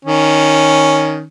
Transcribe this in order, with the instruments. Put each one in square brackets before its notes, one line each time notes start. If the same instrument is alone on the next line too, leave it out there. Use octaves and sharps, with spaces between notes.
[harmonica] D#3 C#4